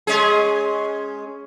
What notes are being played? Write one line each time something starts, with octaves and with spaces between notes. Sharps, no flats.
G#3 C#4 G#4